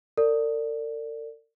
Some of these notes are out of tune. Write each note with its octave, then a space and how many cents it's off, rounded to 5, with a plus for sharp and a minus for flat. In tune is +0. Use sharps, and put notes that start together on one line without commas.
A#4 -45 D5 +0